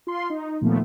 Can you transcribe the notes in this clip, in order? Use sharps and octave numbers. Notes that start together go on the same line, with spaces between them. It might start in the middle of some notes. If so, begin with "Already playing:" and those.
F4 C6
D#4
D#2 A#2 F3 A3 B3